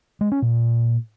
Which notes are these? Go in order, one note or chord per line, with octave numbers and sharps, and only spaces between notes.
G#3
C#4
A#2